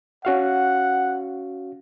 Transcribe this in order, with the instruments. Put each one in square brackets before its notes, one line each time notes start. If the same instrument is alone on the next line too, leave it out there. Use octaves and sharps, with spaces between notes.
[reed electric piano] C#4 F#4 F5 [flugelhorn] F#5